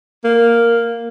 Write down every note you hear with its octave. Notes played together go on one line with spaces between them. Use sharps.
A#3